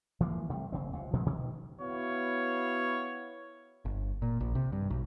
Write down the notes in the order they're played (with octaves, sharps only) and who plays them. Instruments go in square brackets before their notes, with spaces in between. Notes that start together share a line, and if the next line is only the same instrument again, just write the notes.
[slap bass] E3 F3 G#3 A#3
C3 G3 A3
F#1 C#3 C4
C#2 C3
A#2 F3 G#3 A3
B2 D#3
[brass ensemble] B3 E4 F#4 C#5 F5
[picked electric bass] G1
A#2
A#1
C3
G2
B1